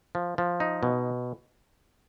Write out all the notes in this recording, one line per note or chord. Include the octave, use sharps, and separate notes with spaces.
F3
F3
D#4
B2